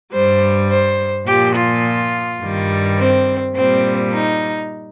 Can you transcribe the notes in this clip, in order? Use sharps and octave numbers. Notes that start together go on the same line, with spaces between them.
G2 G3 C5
C5
A#2 F3 G4
F4
G2 D#3 G3
C4
A#2 G3 C4
D#4